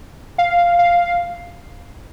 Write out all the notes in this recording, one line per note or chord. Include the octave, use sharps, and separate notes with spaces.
F5
F5